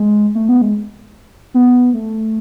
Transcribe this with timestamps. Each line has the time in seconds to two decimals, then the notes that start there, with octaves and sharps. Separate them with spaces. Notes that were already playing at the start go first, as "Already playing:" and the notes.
Already playing: G#3
0.35 A3
0.49 B3
0.62 G#3
1.54 B3
1.93 A3